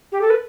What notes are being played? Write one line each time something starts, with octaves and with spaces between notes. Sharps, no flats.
G4
A4
B4